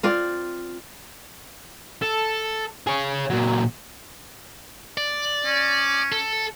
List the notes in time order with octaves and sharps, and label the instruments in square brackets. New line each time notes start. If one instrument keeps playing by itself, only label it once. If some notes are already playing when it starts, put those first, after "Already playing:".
[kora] C4 F4 D5
[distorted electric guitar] A4
G#4 C#5
A#2 F#3
[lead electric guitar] D5
[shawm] C#4
[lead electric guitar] A4